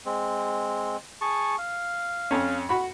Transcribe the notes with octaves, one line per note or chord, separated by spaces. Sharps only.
G#3 C4
G#4 A5 C#6
F5
F2 C#4
F#4 B5